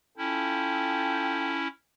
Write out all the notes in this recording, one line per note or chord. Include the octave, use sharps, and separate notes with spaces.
C#4 E4 F4 A4 G5